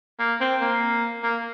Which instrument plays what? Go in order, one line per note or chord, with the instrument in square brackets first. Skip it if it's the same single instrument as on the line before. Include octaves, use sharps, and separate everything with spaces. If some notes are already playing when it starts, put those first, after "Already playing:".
[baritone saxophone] A#3
C4
A#3
A#3